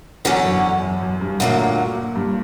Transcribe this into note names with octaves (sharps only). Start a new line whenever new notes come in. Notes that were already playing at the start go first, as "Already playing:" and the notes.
E2 D3 F#3 C#4
F#2
F#2
F#2
G2
D2 A#2 D3 F#3 A#3
G2